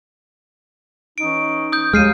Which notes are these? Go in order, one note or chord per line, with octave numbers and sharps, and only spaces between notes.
E3 C#4 D#4 D7
D#6 G6
D#2 G#3 F6 C7 D#7